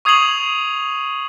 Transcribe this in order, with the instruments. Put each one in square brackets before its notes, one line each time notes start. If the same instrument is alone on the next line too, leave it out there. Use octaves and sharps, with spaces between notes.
[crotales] C#6 D#6 G#6 C7 F7 F#7